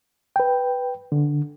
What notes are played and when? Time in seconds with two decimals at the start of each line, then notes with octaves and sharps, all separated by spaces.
0.36 B4 G5
1.12 D3